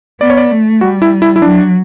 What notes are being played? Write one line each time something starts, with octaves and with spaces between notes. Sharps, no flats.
B3 D5
C#5
D5
A3
G3 F#4
E4
E4
E4
F#3 D4